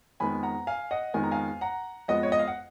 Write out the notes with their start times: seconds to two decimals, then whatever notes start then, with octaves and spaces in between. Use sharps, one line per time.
0.20 F2 D#3 G#3 B3 G#5 B5
0.43 F#5 A#5
0.67 F5 G#5
0.91 D#5 F#5
1.14 F2 D#3 G#3 B3 G#5
1.23 A#5
1.31 F5 G#5
1.61 F#5 A#5
2.08 F2 F3 G#3 B3 D#5 F#5
2.23 C#5
2.32 D#5
2.39 F5
2.48 F#5